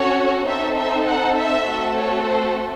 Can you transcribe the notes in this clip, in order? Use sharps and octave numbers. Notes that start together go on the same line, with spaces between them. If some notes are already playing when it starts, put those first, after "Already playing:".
Already playing: C#4 F#4 A4 C#5
C4 D#4 A4 E5
E5
F#5
E5
A3 C4 F#4 A4
C#5
C5